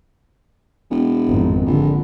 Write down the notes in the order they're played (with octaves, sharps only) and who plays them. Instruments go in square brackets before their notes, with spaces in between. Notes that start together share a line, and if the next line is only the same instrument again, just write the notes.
[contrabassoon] E1
[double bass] G#1 F2
[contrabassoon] A#1 [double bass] D3